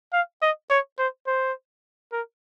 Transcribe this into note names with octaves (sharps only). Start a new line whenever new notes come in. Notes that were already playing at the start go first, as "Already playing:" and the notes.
F5
D#5
C#5
C5
C5
A#4